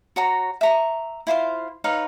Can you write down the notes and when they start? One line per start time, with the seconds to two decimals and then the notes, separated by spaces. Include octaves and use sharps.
0.16 F#4 C#5 A#5
0.61 E5 A#5 C#6
1.27 E4 F4 C5 F5
1.84 D#4 B4 C#5 F5